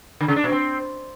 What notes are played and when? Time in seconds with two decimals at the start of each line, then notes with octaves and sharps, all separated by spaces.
0.21 D3
0.28 C#3
0.36 D4
0.44 B2
0.52 C4